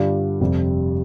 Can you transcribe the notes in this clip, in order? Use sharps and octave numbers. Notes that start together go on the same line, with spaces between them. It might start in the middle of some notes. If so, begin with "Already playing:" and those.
Already playing: G2 D3 G3 D4 F4
F1 F2 C3 G3